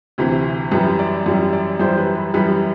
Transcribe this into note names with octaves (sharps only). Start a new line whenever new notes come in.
D2 C3 E3
F#2 E3 G3 B4
D5
F#2 E3 G3
D5
F#2 E3 G3 C5
B4
B4
F#2 E3 G3 B4